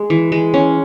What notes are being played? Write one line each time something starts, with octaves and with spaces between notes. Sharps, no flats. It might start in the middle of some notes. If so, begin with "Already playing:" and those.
Already playing: G#3
E3
G#3
C#4